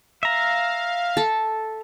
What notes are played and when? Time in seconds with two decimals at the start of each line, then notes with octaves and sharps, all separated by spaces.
0.23 E5 F5 A#5
1.17 A4